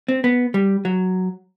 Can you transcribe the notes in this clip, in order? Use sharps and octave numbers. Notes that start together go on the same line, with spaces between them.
C4
B3
G3
F#3